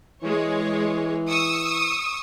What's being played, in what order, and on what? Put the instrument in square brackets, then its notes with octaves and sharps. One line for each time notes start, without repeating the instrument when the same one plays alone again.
[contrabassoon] E3 [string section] G#3 C#5
[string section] C#6 D#6 E6